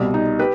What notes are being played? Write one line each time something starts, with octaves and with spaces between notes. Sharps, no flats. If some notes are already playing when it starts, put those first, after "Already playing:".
Already playing: C2 B2 G3
D#4
G4 B4